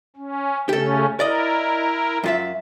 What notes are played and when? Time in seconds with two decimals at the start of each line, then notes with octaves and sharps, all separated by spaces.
0.16 C#4
0.69 C#3 A3 C#4 G4 A4
1.20 E4 A#4 D5 D#5
2.24 F#2 F4 E5